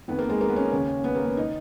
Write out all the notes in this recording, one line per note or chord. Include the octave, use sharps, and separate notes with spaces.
F2 D#3 B3
A#3
G#3
A#3
B3
C#4
D#2 C#3 C#4
B3
A#3
B3
D#3 D#4